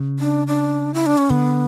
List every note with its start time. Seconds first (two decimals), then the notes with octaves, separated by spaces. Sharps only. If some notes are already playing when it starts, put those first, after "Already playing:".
Already playing: C#3
0.19 D4
0.47 D4
0.94 E4
1.06 D4
1.18 C#4
1.30 D3 B3